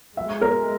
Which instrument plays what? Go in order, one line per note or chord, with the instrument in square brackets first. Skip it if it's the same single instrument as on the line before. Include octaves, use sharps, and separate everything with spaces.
[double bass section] G#3 [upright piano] E5
[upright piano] A#4